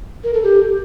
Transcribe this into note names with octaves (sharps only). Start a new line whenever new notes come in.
A#4
A4
G4